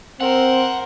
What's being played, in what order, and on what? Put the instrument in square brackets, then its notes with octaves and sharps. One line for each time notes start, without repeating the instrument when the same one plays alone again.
[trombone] C4 [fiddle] A#4 C5 [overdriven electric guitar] F#5